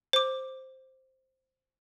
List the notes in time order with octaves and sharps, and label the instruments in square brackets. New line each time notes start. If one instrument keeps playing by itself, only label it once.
[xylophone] C5 D6